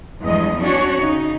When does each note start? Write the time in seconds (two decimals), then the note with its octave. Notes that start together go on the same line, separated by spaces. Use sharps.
0.23 E2 G2 F3 G#3 D#5
0.60 C#4 D4 F#4 C#5
1.01 C#3 D#4